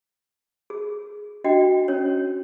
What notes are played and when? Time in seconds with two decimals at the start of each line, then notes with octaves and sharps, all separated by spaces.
0.70 G#4
1.44 D4 F#4 D#5 G5
1.88 C#4 C#5